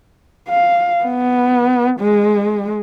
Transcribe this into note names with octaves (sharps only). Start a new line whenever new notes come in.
F5
B3
G#3